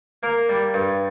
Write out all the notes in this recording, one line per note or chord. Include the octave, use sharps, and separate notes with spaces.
A#3 A#4
G3
G2